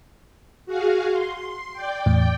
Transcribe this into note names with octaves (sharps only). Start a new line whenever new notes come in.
F#4 G#4 F5
C6
D5 G5
E2 A2